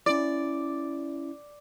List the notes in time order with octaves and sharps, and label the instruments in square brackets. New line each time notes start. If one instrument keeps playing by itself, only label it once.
[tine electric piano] C#4 E4 [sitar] D5